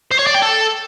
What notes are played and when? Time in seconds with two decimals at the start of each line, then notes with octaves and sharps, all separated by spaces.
0.11 C5
0.19 C#5
0.27 D5
0.34 G5
0.42 A4